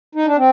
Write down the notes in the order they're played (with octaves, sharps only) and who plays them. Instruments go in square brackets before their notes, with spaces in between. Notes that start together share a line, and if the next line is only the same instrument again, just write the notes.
[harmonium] D#4
D4
C4